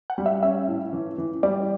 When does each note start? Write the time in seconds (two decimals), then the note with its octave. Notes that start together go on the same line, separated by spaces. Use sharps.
0.10 F#5
0.18 G3
0.26 E5
0.43 C#4 E5
0.68 A2
0.93 E3
1.18 E3
1.43 G3 D5